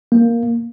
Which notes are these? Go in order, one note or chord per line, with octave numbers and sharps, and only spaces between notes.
A#3